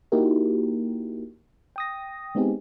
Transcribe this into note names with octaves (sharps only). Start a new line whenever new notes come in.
A#3 D#4 E4 F#4 G4 A#4
G5 D#6 A#6
G#3 B3 C4 D#4 G4 G#4